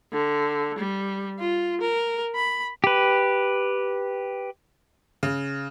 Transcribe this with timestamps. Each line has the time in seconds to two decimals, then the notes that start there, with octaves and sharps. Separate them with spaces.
0.13 D3
0.78 G3
1.39 F4
1.81 A#4
2.35 B5
2.84 G4 B4
5.23 C#3